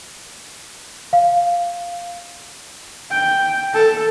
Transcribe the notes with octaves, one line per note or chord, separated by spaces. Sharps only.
F5
G5
A4